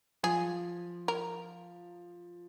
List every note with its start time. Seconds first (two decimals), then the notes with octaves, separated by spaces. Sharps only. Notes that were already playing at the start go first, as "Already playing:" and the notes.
0.23 F3 G#4
1.08 A#4